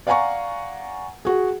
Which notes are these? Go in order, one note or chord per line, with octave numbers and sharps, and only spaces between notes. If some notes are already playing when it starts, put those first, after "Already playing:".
D5 F5 F#5 G#5 A#5 C#6
F#4 G#4